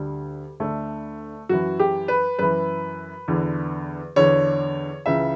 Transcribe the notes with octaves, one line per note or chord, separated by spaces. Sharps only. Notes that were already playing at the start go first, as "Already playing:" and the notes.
Already playing: D2 D3 G3
D2 D3 A3
F#2 E3 F#4
G4
B4
F#2 E3 B4
E2 D3
E2 D3 C#5
C#2 C#3 E3 E5